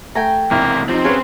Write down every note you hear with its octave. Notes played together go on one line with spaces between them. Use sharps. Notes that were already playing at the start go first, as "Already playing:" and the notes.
A3 G5 G#5 A#5
B1 E2 C3 A#3 E4 F6
C3 F3 C4 D#4
F#3 C#4 G#4 B4 F5